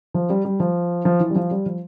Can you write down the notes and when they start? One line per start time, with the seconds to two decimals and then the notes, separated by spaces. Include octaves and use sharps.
0.14 F3
0.30 G3
0.45 G3
0.60 F3
1.05 F3
1.20 E3
1.30 G3
1.35 F3
1.51 G3
1.66 F3